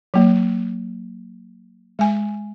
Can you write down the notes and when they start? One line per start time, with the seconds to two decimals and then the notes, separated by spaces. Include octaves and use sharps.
0.14 F#3 A#3
1.99 G#3 G#5